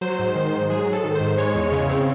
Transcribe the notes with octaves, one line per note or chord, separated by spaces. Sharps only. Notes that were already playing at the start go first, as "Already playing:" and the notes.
F#3 C5
G#2
D#3
G#2
F#3 G#4
G#2
A4
D#3
C5
G#2
G#3 C#5
E2
C#3
C4